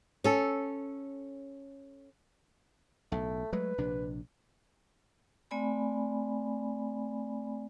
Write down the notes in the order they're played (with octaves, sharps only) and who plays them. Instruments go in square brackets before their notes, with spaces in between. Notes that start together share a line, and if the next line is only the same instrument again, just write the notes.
[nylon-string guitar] C#4 A4
[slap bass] B1 A2 [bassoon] A3
[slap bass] F#3 G#3 A3 [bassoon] B4
[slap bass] A#1 C3 D4
[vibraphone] A3 C4 D5 G#5 B5